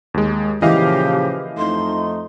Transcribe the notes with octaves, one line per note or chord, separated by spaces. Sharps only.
D#2 G#3
A#2 C#3 E3 F3 G4 D#5 F5
F2 A3 D#4 C6